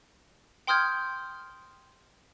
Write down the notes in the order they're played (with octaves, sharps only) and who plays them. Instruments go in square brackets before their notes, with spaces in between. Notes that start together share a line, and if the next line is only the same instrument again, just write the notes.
[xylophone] G5 C6 D#6 F6 G6 G#6